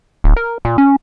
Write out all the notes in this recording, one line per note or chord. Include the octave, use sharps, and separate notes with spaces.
D1
A#4
A#2
C#4